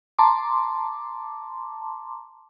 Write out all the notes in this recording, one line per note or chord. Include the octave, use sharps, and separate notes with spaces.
A5 A#5 C6 D6